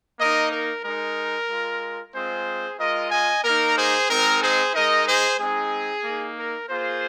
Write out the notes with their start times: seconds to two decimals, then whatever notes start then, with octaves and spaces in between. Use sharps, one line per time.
0.19 A#3 D#4 A#4 D#5
0.52 A#4
0.84 G#3 D#4 A#4
1.49 G#3 F4
2.14 G#3 C4 F4 G#4 C5
2.79 G#3 F4 A#4 D#5
3.11 D#5 G#5
3.44 A#3 D#4 A#4
3.76 G#4 C5
4.09 G#3 C4 D#4 A#4
4.42 G#4 C5
4.74 G#3 D#4 A#4 D#5
5.06 G#4 C5
5.39 G#3 C4 D#4 G#4
6.04 A#3 D#4
6.37 A#4
6.69 A#3 F4 G#4 C5